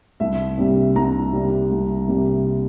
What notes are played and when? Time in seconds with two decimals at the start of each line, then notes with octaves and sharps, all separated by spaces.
0.20 C2 E5
0.58 C3 G3 A#3
0.96 C2 A#5
1.33 C3 G3 A#3
1.71 C2
2.08 C3 G3 A#3